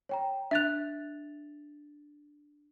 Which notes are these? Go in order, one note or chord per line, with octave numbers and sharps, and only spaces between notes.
C#5 G5 A#5
D4 E5 F#6 A6 F7